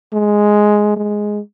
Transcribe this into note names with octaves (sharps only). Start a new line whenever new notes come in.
G#3
G#3